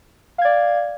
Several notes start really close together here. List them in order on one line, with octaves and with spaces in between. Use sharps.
F5 G#6 D5